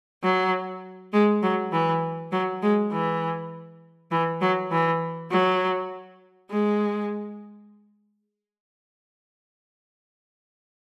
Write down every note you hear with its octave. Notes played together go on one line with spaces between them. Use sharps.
F#3
G#3
F#3
E3
F#3
G#3
E3
E3
F#3
E3
F#3
G#3